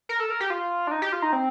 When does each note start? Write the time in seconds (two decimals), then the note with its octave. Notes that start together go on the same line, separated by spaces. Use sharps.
0.09 A#4
0.20 A4
0.30 A#4
0.40 G4
0.50 F4
0.87 D4
0.91 D#4
1.02 G4
1.13 F4
1.22 D#4
1.33 C4